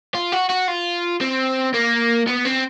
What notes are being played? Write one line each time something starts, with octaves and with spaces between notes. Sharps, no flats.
F4
F#4
F#4
F4
C4
A#3
B3
C4